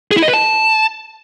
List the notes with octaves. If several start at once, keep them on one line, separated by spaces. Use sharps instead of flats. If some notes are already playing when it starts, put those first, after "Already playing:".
G#4
E4
D#5
B4
A5